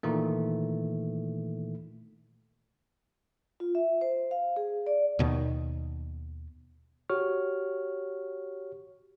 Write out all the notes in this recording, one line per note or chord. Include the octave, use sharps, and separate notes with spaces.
A#2 D#3 E3 A3
F4
E5
C5
F5
G#4
D5
D#2 B2 D#3
F#4 G4 C#5 C#6 F6